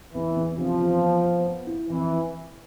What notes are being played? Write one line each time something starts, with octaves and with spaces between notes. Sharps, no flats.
E2 E3
E2
C3 F3
E2
B3
B3
B3
E4
F2 E3